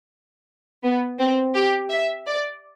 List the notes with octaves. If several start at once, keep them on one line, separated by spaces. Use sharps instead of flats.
B3
C4
G4
E5
D5